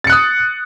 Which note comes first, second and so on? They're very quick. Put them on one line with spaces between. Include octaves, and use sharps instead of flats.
A6 C#7 F#6 D#6